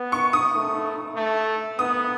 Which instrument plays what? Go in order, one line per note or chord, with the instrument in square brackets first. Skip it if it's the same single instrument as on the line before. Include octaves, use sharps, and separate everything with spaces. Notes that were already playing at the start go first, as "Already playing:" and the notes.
Already playing: [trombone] B3
[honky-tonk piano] C#6
D#6
[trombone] A3
A3
[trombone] B3 [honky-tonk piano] D#6